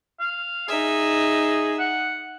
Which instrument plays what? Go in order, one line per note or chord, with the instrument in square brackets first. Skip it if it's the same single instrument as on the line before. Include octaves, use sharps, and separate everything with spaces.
[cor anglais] F5
[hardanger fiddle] D#4 E5 [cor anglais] G#4
[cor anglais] F#5